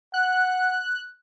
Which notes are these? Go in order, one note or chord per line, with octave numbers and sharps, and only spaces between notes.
F#5 F#6